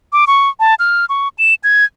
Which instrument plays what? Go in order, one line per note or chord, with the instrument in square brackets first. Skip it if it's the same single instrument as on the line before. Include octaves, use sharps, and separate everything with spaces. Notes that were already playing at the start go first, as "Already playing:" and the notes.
[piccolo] D6
C#6
A5
F6
C#6
E7
G#6